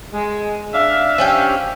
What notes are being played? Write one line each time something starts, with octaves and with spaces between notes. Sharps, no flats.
G#3
D4 E5 F5
F3 C#4 G4